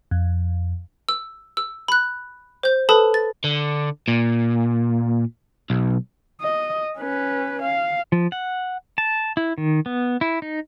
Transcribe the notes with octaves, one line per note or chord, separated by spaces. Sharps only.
F2
E6
E6
B5 F#6
C5 G6
A4 B4 A5 B5 D#6
A6
D3
A#2
B1
D#5
C#4 B4
F5
F3
F#5
A5
E4
D#3
B3
E4
D#4